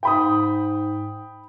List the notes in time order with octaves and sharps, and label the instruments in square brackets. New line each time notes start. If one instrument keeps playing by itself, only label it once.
[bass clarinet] G#2 [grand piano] G5 B5 D#6